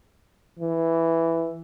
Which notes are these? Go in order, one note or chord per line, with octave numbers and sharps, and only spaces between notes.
E3